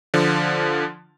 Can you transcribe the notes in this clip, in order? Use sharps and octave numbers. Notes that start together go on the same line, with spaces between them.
D3 F3